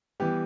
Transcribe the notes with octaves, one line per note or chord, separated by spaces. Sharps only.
E3 G3 B3 G4